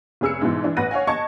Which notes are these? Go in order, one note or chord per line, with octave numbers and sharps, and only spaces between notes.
F1 C#4 G#4 E6 F6 C#7
G#2 B2 E3
E3 D4
A1 B4 F#5 F#6 A#6 D#7
C#5 F5 F#5 G#5
D#5 A5 C#6 G#6 C#7